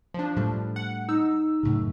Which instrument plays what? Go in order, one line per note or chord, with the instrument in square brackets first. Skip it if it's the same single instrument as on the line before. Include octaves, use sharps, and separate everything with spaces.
[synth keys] F3 D4
[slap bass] A2 G3 A3
[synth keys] F#5
D#4 E6
[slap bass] F#2 A2 C#3